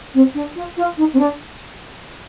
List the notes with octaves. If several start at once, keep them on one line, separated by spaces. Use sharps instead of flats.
C4
D4
F4
F4
D#4
C4
D4